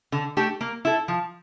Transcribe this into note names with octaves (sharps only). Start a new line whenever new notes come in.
D3
A3 D4 G4
A#3
E4 A4
F3